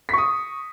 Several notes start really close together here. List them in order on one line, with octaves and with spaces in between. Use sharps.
B6 C#6 D#6